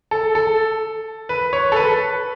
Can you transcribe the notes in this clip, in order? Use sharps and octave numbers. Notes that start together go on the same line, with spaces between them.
A4
A4
B4
C#5
A4
B4